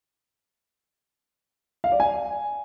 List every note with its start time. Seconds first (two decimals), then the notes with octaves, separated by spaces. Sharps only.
1.84 F5
1.92 D5
2.00 G#5